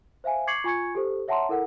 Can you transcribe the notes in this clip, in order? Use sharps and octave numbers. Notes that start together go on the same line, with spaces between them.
C5 E5 F5 G#5
C#6 D6 G#6 C7 C#7 F#7
F4 G#5 C#6 G#6 C#7
G4 A4 C5
C#5 E5 F#5 A5 A#5 C6
E4 A4 A#4 F#5